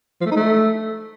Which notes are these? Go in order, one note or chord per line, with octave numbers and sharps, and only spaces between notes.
F3
A3
D#4
A3